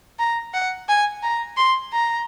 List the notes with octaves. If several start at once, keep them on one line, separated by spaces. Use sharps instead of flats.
A#5
F#5
G#5
A#5
C6
A#5